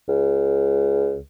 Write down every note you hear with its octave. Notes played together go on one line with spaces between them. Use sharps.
C#2